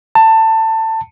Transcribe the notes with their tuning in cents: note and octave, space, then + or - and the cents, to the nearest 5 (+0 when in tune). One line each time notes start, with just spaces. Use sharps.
A5 +20